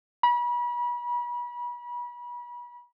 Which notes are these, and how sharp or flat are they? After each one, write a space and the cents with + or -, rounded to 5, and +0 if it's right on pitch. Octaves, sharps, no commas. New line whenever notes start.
B5 -35